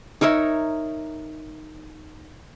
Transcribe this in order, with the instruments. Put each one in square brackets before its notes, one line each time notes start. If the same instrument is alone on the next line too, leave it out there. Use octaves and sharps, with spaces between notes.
[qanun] D#4 A#4 C#5 E5